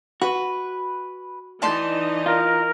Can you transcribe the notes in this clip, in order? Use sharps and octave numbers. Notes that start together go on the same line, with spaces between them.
F#4 B4
E3 D#4 D5 D#5 A5 C6
F4 A#4